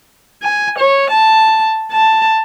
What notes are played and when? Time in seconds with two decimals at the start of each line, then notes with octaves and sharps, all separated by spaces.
0.42 G#5
0.78 C#5
1.10 A5
1.92 A5